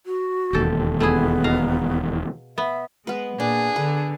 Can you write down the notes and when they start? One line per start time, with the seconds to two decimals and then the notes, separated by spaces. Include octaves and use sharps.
0.06 F#4
0.53 E1 D#2 G4 A4
1.00 A3 B3 E4 G#4
1.44 B2 F5 A#5
2.58 B3 E5
3.07 G#3 B3 B4
3.40 A#2 D4 G#4
3.76 D3 B4